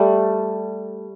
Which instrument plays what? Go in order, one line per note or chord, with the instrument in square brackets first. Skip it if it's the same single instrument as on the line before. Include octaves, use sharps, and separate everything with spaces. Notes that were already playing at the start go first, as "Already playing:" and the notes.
Already playing: [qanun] G3 A3